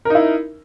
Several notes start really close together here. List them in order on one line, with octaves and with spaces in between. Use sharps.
A#4 D#4 E4